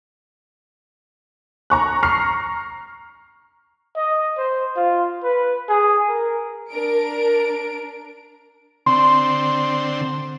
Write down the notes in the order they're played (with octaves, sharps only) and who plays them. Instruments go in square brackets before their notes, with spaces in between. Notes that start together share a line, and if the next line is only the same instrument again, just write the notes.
[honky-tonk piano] A#5 C#6 F#6
A#5 C#6 F6 C7
[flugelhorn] D#5
C5
F4
B4
G#4
A#4
[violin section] D4 A#4 D7
[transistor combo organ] D3 C4 [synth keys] C6